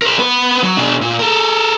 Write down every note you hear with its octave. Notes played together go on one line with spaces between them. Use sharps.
A#4 C5
B3 B4
F#3
B2 D4
A#2
A4 A#4